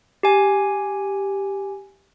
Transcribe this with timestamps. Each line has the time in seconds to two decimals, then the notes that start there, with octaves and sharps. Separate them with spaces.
0.23 G4 G#5